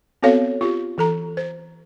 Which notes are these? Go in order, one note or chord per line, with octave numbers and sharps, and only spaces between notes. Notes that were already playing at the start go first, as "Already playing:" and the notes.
B3 C4 F#4 A4 C#5 F5
F4 G4
E3 A4 A#5
C5